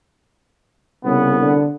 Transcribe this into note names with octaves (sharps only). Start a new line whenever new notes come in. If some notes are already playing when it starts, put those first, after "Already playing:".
C2 C#3 B3
D3